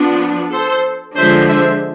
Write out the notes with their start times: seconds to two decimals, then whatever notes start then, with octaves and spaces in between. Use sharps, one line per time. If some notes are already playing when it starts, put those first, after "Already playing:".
Already playing: F3 B3 D4
0.52 A4 C5
1.17 D3 F3 G#3 D4 C5 E5
1.48 C5 E5